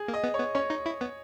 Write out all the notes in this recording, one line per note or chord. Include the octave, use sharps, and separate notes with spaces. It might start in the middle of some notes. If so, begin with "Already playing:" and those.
Already playing: G#4
A#3
D#5
B3
B3 C#5
C#4 C#5
D#4
E4
B3